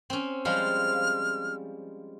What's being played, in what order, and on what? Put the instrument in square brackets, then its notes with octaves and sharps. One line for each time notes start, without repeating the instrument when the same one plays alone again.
[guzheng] C4 C#4
[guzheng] F3 G3 G#3 [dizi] F6